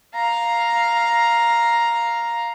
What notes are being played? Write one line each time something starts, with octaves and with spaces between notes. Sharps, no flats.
F5 A#5